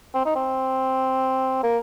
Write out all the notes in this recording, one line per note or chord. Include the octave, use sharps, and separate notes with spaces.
C4
D#4
C4
A#3